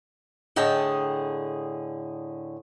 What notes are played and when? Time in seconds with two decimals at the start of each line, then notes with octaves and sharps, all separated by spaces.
0.56 A2 D3 G#4 D#5 G5 A5